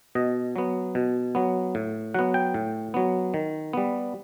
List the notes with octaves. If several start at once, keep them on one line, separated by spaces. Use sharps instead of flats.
B2 D#5
F#3 B3
B2
F#3 B3
A2
F#3 B3 F#5
G5
A2
F#3 B3
D#3
G3 B3